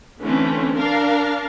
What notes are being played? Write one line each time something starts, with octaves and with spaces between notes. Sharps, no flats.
D3 E3 A3 C4 C#4
D4 A#4 F5